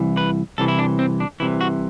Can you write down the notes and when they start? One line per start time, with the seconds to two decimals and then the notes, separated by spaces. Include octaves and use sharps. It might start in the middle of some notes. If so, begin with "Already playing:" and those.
Already playing: C2 E3
0.17 B4
0.58 C2 C3 E3 A4
0.68 E4
0.79 D4
0.99 C4
1.20 D4
1.40 C2 C3 E3 E4
1.61 F#4